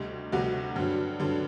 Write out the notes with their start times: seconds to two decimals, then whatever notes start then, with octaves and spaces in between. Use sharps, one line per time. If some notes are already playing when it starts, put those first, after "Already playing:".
Already playing: D2 C3 G3 D#4
0.32 D2 C3 G3 F#4
0.76 G2 D3 F#3
1.20 G2 D3 F#3